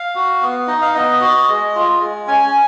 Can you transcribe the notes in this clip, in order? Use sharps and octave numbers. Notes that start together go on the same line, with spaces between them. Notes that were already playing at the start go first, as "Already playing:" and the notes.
Already playing: F5
F#4
B3
D#4 D#5
F5
B3 D#5
F#4
G#3
F4
G#3
C#4 G#5